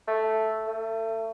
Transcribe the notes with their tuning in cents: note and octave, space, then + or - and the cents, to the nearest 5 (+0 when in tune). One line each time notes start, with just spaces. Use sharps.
A3 +0
A3 +30